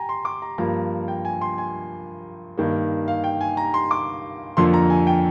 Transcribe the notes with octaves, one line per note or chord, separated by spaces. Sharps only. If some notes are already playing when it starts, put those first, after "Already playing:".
Already playing: G5 G#5 A#5
C6
D6
A#5
G2 F3 A#3 A#5
G5
G#5
C6
G#5
G2 D#3 A#3
F5
G5
G#5
A#5
C6
D6
F2 D3 F3 A#3 C6
A#5
G#5
G5